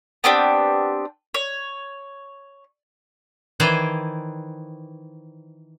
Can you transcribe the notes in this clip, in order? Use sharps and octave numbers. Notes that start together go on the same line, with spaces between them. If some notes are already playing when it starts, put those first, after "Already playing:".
B3 C4 D4 G4
C#5
D#3 E3 C5 D5 G5 G#5